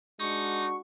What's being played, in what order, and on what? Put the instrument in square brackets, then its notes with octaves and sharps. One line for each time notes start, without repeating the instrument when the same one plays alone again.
[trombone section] G#3 D4 F#4 [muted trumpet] D#4 [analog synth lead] C#6